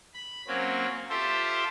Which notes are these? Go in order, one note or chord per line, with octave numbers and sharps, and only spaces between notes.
B5
F#3 A#3 C4 C#4
F4 G4 A4 C5 E5